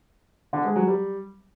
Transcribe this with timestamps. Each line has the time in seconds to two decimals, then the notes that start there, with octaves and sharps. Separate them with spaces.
0.53 D3
0.64 G#3
0.76 F#3
0.87 G3